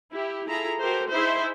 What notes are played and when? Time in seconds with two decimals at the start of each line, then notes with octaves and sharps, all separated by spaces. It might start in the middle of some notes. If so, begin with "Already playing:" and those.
0.12 E4 G4
0.47 E4 F4 G#4 A4 A#5
0.81 F#4 G4 A4 A#4 C5
1.11 D#4 E4 G#4 C5 E5